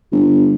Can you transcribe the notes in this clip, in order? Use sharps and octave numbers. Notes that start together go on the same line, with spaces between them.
G1